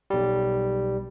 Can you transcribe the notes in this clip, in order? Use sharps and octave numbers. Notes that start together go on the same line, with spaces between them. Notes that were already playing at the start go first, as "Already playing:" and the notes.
B1 G3